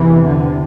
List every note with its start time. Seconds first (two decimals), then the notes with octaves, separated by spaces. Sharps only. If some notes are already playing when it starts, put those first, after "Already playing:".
Already playing: E2 C3 E3
0.25 D3